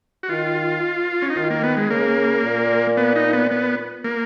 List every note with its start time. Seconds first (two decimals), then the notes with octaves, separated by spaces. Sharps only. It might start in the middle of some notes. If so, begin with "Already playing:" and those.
0.23 F#4
0.29 D#3 F4
1.22 C#4
1.30 D#4
1.36 D#3 F4
1.50 A#3
1.63 B3
1.77 G#3
1.90 C#3 A#3
2.45 A#2
2.97 B3
3.16 D#4
3.33 B3
3.51 B3
4.04 A#3